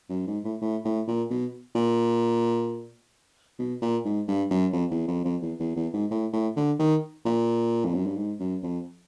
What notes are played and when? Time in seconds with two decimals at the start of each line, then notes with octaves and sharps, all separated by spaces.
0.10 F#2
0.27 G#2
0.44 A2
0.61 A2
0.85 A2
1.07 A#2
1.30 B2
1.75 A#2
3.59 B2
3.82 A#2
4.05 G#2
4.28 G2
4.51 F#2
4.73 F2
4.91 E2
5.08 F2
5.25 F2
5.42 E2
5.60 E2
5.76 E2
5.93 G#2
6.11 A2
6.33 A2
6.56 D3
6.79 D#3
7.25 A#2
7.85 F2
7.94 F#2
8.06 G2
8.16 G#2
8.40 F#2
8.63 F2